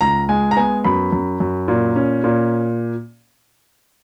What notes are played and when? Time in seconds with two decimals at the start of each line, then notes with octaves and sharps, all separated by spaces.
0.01 C#2 A#5
0.29 G#3 G#5
0.51 A#5
0.56 B3 G#5
0.84 F#2 B5
1.12 F#2
1.40 F#2
1.68 A#2
1.96 C#4
2.24 A#2